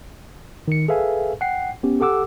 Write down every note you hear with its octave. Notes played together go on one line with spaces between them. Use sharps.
D#3 C#7
G#4 A4 B4 E5 F5 G#5
F#5 G5 C7
B3 C#4 G4
G4 A4 F#5 D6 E6